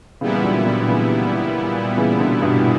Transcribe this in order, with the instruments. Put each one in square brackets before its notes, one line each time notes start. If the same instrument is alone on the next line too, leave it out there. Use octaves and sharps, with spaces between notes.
[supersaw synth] A#2 G3 B3 E4 [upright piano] C#3 E3
[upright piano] E3
D3 F#3
D3 F#3
D3
C#3 E3
C#3 E3
B2 D3
G2 B2